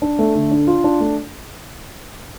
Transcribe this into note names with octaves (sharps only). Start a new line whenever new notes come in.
D4
A3
D3
D4
F4
D4
A3